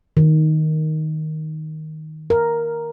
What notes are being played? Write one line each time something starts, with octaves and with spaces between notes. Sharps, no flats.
D#3
A#4